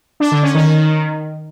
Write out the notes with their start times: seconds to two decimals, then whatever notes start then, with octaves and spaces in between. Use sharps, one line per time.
0.20 D4
0.31 D3
0.43 C#4
0.54 D#3